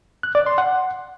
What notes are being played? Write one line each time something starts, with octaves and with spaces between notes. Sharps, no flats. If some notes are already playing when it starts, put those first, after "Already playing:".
F#6
D5
C6
F#5